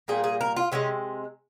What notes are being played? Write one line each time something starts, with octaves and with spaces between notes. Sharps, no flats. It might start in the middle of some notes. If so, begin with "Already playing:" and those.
A#2 G3 A#3 G#4
G#4
A#4
F4
C3 D#3 G#3 C#4